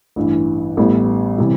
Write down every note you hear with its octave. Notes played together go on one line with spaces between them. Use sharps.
A1 G2 E3
A1 A2 G3 B3 E4
C3 E3 G3